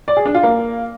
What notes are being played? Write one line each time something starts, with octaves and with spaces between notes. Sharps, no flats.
D5
G#4
D4
F4
A#3